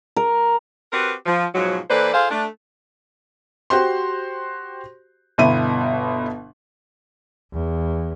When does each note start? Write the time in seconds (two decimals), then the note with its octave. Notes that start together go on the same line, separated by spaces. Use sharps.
0.16 A#4
0.92 C4 F#4 G4 A#4 B4
1.26 F3
1.55 G#2 B2 F3 F#3
1.90 E3 A#3 A4 B4 C5 D5
2.14 F4 G#4 A4 C5 F5
2.31 A3 D4
3.70 F#4 G4 C5 C6
5.38 G1 B2 E4 D#7
7.53 E2